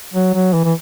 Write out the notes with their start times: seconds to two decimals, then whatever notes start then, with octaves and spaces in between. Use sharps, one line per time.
0.14 F#3
0.34 F#3
0.53 E3
0.64 E3